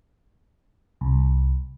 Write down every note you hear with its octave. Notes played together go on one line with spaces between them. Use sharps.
C2